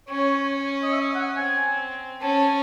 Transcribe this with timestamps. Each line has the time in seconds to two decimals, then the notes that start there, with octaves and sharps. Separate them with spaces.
0.09 C#4 C#5
0.83 D#5
0.93 E5
1.15 F#5
1.36 C4 G#5
2.21 C#4 A5